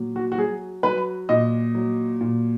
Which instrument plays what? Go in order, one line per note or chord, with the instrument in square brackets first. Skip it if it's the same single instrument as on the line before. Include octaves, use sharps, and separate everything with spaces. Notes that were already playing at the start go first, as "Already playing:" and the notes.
Already playing: [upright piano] A#2 F#3
F#4
F#4
F#3 G#4
F#3 B4
A#2 D#5
F#3
A#2